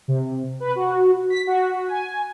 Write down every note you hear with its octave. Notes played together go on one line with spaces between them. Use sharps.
C3
B4
F#4
B6
F#4
G#5